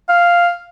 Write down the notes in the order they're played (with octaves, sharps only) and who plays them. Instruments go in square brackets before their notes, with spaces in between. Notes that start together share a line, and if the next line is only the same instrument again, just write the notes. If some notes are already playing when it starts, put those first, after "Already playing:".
[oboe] F5